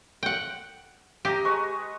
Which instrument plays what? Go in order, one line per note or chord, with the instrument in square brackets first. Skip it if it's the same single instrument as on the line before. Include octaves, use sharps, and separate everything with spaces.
[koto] F#5 G5
[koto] G4 [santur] D#5 A#5
[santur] G#3 B4 C#6